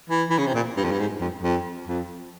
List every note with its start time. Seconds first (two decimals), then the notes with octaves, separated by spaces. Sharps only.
0.10 E3
0.30 E3
0.38 C#3
0.47 C3
0.54 A#2
0.77 G2
0.84 F2
0.92 G2
0.99 G#2
1.21 F2
1.43 F2
1.88 F2